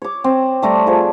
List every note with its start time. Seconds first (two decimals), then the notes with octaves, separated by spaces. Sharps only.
0.02 C#5 D6
0.24 C4
0.62 G3 A3 D5 A#5
0.86 F3 G#4 A4